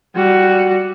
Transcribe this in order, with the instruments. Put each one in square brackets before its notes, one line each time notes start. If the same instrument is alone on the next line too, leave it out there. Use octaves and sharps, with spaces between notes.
[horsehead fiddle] G3 F#4